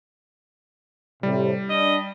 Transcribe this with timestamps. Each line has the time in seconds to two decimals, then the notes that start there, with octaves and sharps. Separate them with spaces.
1.23 A2 C3 G3
1.70 D4 D#5